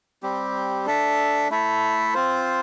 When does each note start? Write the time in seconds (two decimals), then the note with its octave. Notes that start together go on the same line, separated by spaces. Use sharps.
0.23 G3 C4 G4
0.86 D4 A4 E5
1.50 A3 E4 A4 E5
2.14 C4 F4 C5